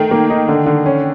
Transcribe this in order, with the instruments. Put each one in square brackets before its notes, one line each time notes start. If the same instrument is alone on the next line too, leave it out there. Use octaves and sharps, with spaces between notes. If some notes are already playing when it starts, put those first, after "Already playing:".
Already playing: [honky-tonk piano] D#3 [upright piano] A3
[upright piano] A#3
D#4
D3
D3
C#4